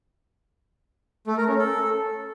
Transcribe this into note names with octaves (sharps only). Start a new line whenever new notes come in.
A3
A#4
C#4
A4